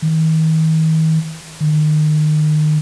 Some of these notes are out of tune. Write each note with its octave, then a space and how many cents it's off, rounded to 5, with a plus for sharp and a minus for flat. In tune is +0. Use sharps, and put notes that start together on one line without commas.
D#3 +40
D#3 -30